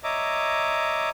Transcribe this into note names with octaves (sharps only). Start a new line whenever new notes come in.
C#5 D#5 E5 A#5 D6